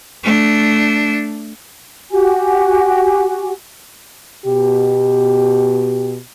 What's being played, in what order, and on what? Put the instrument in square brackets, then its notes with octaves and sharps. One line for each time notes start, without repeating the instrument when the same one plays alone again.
[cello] A3 D4
[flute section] F#4 G4 G#5
[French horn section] B2 G4